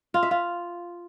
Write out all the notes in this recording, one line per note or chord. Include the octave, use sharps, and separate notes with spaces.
F4
E5
F4